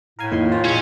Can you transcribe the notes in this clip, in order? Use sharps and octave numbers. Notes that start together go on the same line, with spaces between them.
A2 A#4 F5 G#5
F2 D#3 A#3 E4 F4 C6
C4 C#4 F4 C5
A#2 G#3 C#4